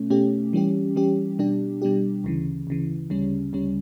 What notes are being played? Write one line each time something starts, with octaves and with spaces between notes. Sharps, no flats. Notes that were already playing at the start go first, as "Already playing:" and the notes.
Already playing: B2 A3 C#4
B2 A3 C#4 G4
E3 G3 C#4 G4
E3 G3 C#4 G4
B2 G3 D4 G4
B2 G3 D4 G4
D2 C#3 E3
D2 C#3 E3
D2 C#3 G3 C#4
D2 C#3 G3 C#4